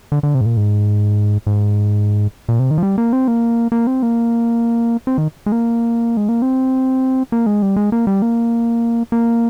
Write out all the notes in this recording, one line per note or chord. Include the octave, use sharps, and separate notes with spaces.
D3
D3
C3
G#2
A#2
G#2
G#2
A#2
C3
D#3
F3
G3
A#3
C4
A#3
A#3
C4
A#3
C4
D#3
G#3
A#3
G#3
A#3
C4
A#3
G#3
G3
G#3
A#3
G3
A#3
A#3